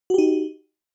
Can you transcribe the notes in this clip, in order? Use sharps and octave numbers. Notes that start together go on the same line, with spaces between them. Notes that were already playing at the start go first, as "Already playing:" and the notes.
D#4 F#4 G4